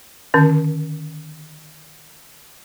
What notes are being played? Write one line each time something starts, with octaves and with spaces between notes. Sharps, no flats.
D3 D#3 C#4